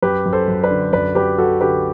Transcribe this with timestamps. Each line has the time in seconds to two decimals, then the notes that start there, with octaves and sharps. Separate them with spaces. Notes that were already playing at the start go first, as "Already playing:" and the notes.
0.02 F#2 G4 B4
0.26 F#2
0.33 A4 C5
0.48 F#2
0.64 B4 D5
0.70 D3
0.92 F#2 B4 D5
1.15 F#3 G4 B4
1.38 F#3 F#4 A4
1.61 D3 G4 B4